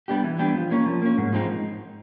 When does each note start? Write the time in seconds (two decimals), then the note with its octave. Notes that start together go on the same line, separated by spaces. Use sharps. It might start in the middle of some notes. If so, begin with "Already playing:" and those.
0.08 G3 B3 D4 G4
0.24 E3
0.39 G3 B3 D4 G4
0.55 F3
0.71 A#3 C#4
0.86 F3
1.02 A#3 C#4
1.18 G#2
1.33 F3 G#3 C4 D#4